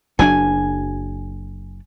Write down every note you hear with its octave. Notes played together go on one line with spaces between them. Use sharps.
F#1 F#3 D4 G#5